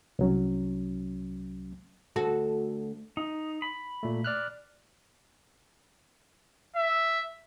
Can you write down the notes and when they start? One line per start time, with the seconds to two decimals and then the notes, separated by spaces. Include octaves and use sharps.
0.19 C2 F#3 C#4
2.16 D2 F#4 A4
3.17 D#4
3.62 B5
4.03 A#2 A3
4.24 D5 F6 F#6
6.76 E5